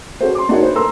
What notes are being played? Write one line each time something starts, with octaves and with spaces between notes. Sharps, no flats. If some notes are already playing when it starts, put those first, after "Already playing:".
C#4 F#4 G#4 A4 C5
C6 D6
D4 D#4 F#4 G#4 A#4 C#5
B4 C5
A4 A#4 A#5 C6 E6